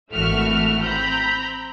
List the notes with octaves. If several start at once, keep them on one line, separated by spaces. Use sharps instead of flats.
G#1 E3 A3 F#4 E5 F6
C4 A#5 B5 G6